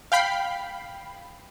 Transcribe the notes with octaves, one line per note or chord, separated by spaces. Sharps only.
F5 G5 B5 C7